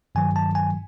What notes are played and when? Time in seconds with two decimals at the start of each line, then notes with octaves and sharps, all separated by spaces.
0.15 G2 D#3 F#3 G#5
0.36 A5
0.55 G#5